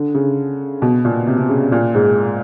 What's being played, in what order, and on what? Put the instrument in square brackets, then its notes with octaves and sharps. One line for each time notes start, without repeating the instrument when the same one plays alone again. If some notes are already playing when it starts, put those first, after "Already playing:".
Already playing: [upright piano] D3
C#3
B2
A#2
C3
C3
C#3
A#2
G#2